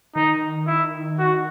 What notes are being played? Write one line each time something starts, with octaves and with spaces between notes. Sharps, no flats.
D#3 D#4
E4
F#4